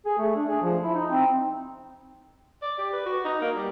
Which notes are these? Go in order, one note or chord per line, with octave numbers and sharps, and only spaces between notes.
G#4
A3
D4
G#4
F3
E4
D#4
C4
D5
G4
B4
F#4
D#4
A#3
G3